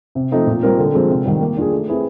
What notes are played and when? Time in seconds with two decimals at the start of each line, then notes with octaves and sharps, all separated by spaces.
0.15 C3
0.32 F3 A3 C4 D#4
0.47 A#2
0.63 G3 C4 F4 A#4
0.78 D3
0.94 F3 G#3 C4
1.10 C3
1.26 D#3 G3
1.41 A#3
1.56 D4 F4 G#4
1.72 A3
1.87 C4 E4 G#4 B4